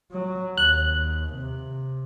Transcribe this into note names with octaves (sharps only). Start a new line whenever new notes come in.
F#3
D#2 F#6
C3